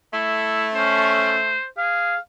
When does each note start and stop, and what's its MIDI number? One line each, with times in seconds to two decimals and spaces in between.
0.13 1.56 57
0.13 0.69 64
0.75 1.39 61
0.75 1.65 72
1.78 2.14 68
1.78 2.18 77